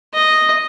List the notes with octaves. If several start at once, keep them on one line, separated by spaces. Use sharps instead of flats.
D#5